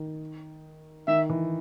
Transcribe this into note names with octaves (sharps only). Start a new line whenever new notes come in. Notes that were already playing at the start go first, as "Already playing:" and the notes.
Already playing: D#3
D#3 E5
E3